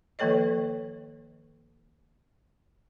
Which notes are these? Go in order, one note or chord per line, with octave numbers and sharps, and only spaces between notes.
D#3 F3 A#3 A4 C#5 D#5